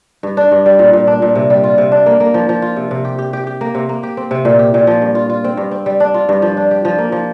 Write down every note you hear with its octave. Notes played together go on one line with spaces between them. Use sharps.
G2
D4
G2
G3
A#2
A#2
D4
A#2
C3
G3
F4
C3
D4
A#3
A#3
F3
F3
F4
C3
C3
G4
G4
G4
G4
A#3
C3
A#3
G4
C4
C3
A#2
G4
A#2
F3
G2
F4
F4
C4
G2
C4
G3
D4
F4
G2
F3
D4
G4
F3
A#3
F3